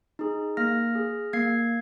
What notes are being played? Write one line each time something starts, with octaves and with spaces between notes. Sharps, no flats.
D#4 G#4
A#3 F6 A#6
G#4
A#3 G#6 C7